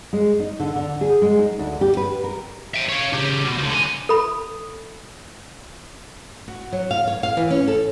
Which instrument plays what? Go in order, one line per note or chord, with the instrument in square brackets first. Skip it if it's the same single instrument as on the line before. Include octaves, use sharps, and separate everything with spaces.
[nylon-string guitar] G#3
D#4
D3
D3
G#4
G#3
D#4
D2
G4
B4
A#4
[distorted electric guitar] E5 G5
C#5 F5
C#3 G4
B2
C#2 D3
F#3 G#5
[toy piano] A4 B5
[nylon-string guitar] F#4
F#3
F5
C#5
F5
E3
C#4
A4